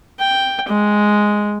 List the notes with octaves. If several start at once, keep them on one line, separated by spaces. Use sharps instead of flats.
G5
G#3